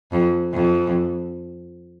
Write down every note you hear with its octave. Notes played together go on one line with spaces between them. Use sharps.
F2
F2